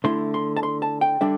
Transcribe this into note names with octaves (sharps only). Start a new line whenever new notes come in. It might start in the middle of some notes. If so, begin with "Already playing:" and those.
D3 A3 E4 C6
C6
A5
C6
A5
G5
D3 G3 D4 E5